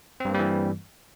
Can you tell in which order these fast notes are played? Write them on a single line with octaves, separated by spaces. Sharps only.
C4 G2 A#3 G3 E3